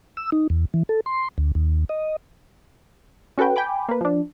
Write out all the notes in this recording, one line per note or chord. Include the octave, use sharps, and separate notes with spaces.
E6
D#4
E2
E3
A4
C6
D2
D#2
D#5
C#4 F#4 A4 B4 G5
G5 G#5 B5 D6
A#3 B4
F3 D4